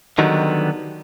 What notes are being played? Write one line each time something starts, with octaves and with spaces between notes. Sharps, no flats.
D3 D#3 F#3 G3 B3